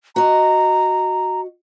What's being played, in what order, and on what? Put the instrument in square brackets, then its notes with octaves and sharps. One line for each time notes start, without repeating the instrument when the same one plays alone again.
[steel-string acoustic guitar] F#4 D#5 [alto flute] A#5